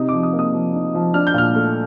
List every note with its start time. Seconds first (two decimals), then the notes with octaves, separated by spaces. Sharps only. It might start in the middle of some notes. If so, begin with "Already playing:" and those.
Already playing: C3 D#4 D#6
0.09 F3 D6
0.23 D#6
0.33 A#3
0.39 D#6
0.53 F3
0.74 D#4
0.95 F3
1.14 D4 F6
1.27 G6
1.34 A#2 F6
1.54 A3